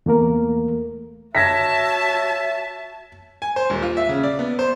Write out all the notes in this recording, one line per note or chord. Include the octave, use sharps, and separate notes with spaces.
E2 A3 A#3 A#4
F#4 C#5 E5 A5 G#6 A#6 B6
G#5
C5
D#1
F4
E5
C#3
D5
B3
C5